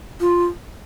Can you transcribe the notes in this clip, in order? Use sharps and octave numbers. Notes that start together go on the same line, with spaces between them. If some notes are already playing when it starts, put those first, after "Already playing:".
F4